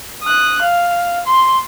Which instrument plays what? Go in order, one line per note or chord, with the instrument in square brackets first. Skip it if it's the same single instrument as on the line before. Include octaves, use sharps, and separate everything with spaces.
[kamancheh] D#6 F#6
F5
C6